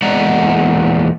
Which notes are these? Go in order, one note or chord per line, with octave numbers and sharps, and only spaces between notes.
E2 A#2 G#3 D5 F#5 A#5